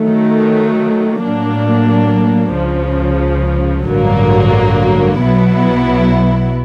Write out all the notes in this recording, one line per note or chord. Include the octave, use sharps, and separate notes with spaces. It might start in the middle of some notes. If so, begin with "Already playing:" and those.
Already playing: D#3 F#3 A3
A2 F#3 A#3 D4
C#2 C#3 F3
A1 G2 D3 F#3 A#3
B1 B2 F#3 B3 E4